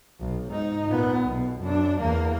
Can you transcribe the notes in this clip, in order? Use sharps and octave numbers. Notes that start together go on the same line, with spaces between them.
B1
G#2 D#4
A#2 B3
B1 B2
F#2 D4
E2 A#3